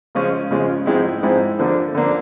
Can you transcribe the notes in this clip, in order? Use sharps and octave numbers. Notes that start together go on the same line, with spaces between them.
C#3 F3 G#3 C#4 F4
C#3 F3 G#3 C#4 F4
G#2 F3 G#3 C4 E4
G#2 F3 G#3 C4 E4
D3 F3 A#3 D4
D3 F3 A#3 D4